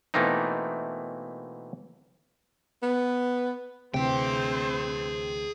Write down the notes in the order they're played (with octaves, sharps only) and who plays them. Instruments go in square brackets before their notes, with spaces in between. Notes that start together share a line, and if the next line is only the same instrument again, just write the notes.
[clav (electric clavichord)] B2 E3 A3 A#3 C4 D#4
[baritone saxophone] B3
[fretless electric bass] D2 E3 [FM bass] C3 [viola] C4 C5 [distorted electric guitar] G#4 G5